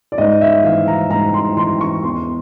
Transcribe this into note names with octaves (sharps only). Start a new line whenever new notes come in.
D5
G#2 D#5
E5
E3 F5
A#5
G#2 A#5
C6
E3 C6
C#6
E2 C6